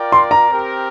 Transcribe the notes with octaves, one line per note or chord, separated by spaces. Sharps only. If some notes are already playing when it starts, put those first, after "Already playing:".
Already playing: F4 A#4 D5 G5
C6
A#5
C4 G4 A#4